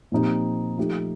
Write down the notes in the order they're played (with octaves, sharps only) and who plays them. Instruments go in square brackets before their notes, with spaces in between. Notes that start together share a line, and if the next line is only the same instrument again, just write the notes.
[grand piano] A#2 F3 C4 D#4 G4
F3 A3 D#4 G4